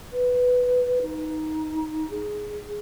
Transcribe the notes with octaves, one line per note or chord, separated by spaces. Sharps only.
B4
D#4
G#4